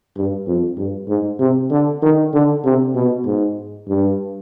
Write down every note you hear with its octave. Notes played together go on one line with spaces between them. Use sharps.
G2
F2
G2
G#2
C3
D3
D#3
D3
C3
B2
G#2
G2